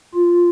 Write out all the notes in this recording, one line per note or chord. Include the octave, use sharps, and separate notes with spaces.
F4